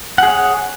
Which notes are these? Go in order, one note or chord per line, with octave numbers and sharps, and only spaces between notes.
G#4 C#5 F#5